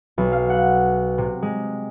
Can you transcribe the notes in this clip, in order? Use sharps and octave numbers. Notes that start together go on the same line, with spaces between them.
B1
F5
F#5
C3
G#3